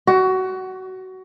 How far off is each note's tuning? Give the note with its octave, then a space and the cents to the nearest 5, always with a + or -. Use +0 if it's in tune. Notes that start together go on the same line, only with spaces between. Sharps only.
F#4 +20